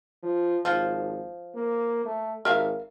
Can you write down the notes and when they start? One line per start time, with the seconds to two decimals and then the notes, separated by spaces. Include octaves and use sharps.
0.23 F3
0.65 G#1 F3
1.55 A#3
2.05 A3
2.45 G#1 A#4 E5 F5